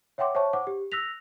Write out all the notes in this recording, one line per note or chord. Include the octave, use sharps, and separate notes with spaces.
C#5 E5 F#5 G5 C6 D6
C5 C#5 E5 A5 C#6
C5 F#5 D6
G4
E6 F#6 A#6 B6 F7